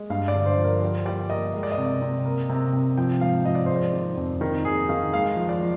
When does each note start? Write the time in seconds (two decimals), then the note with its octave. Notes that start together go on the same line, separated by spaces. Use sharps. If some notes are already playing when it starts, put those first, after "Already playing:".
Already playing: G#3
0.10 G2 F5
0.28 D5
0.34 D3
0.46 C5
0.58 F3
0.64 A#4
0.82 G3 C5
1.06 G3 D5
1.30 A#3 D#5
1.54 G#3 D#5
1.63 D5
1.72 D#5
1.78 C3
2.02 C3
2.26 A#3
2.49 C3
2.73 C3
2.97 F3 G5
3.21 G#2 F5
3.46 F3 D#5
3.55 D5
3.66 G#3 C5
3.76 D5
3.93 D#3
4.17 F2
4.41 D#3 A#4
4.65 A#3 G#4
4.89 D#3 F5
5.13 G#3 F5
5.36 F3
5.49 D5
5.61 F3